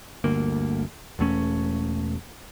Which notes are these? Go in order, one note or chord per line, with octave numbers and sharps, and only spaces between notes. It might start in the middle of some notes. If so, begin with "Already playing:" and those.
G1 D2 A#3
E1 E2 A3 C#4